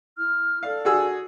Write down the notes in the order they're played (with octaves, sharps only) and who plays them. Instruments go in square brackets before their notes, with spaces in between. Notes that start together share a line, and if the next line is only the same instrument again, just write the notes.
[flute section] E4 F6
[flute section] A4 D5 [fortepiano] F5
[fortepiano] F#4 G#4 E6